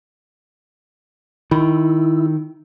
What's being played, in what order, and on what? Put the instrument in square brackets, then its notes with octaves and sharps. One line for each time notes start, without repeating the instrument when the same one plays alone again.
[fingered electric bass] D#3 [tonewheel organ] E4